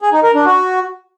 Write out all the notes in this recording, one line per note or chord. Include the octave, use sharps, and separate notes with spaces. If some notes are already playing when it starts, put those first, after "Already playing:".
G#4
D#4
A#4
D4
F#4